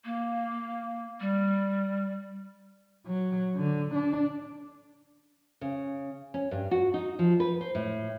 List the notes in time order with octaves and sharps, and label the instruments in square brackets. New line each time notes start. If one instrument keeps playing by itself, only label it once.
[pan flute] A#3
G3
[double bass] F#3
D3
D4
[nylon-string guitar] C#3
C#4
G2
F#4
D#4
F3
B4
C5
A2